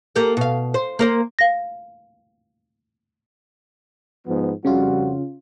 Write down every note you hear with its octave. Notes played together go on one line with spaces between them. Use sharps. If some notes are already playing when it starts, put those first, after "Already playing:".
A#3 G4 A4
B2 F5
C5
A#3 A#4 C5
F5 A#6
G#2 F3 B3
F2 C#3 G3 C#4 F4 F#4